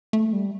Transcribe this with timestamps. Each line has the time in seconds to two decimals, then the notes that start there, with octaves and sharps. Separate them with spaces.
0.13 A3
0.33 G3